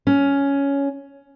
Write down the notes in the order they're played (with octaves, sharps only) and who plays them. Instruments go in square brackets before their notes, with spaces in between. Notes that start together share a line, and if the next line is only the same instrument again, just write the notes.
[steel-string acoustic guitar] C#4